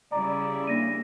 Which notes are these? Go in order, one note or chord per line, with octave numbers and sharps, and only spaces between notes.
C#3 G3 E4 D5 A#5
A#3 D4 A#6 D#7